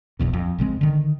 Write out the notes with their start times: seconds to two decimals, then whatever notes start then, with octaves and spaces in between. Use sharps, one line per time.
0.19 D#1 A#1 E2 B2
0.33 F2
0.58 A#1 C#3 G#3 C4
0.81 D3 D#3